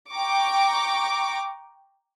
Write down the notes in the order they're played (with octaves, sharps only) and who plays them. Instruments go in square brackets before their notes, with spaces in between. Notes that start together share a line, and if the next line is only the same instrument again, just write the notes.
[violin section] G5 A#5 C#6 D6